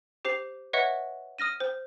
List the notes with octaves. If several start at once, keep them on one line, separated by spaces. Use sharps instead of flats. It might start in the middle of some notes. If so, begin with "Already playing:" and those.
G4 C5 C7 F7
B4 C#5 D#5 E5 F#5 C#6
D#6 F6 A#6 D#7
C5